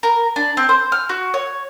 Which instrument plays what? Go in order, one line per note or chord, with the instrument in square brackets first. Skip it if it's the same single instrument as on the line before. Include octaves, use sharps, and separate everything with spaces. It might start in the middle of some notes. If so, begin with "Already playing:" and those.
[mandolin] A#4
D4
C4
C5
F6
F#4
C#5